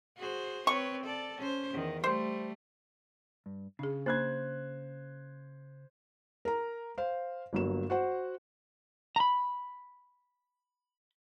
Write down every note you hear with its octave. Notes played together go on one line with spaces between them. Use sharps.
F#4 G#4 C5
C4 B4 C#5 C#6
A4 D5
C#4 C5
E2 D#3
G3 A3 C5
G2
C#3 D4 G#4
A#3 D4 C5 F#6 G#6
A#4 A#5
C5 F5
G1 G2 F#3 A#3 E7
F#4 C5 F#5
A#5 B5